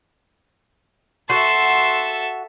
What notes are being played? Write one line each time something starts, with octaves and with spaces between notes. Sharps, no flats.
F#4 A4 E5 C6